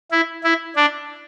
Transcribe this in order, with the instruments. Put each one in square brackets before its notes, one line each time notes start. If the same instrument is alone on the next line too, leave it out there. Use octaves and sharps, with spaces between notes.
[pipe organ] E4
E4
D4